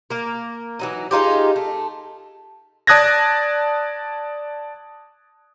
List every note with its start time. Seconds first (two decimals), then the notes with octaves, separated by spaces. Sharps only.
0.10 A#3 A#4
0.79 E3 F#3 D#4
1.11 G#3 D#4 F4 G4
1.56 A3
2.87 D5 A5 D#6 F#6 G#6 A#6